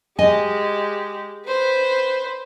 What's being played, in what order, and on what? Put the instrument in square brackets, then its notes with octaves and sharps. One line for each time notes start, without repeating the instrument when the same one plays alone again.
[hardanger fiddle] G#3 G4 [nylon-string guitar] D#5 G#5
[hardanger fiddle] B4 C5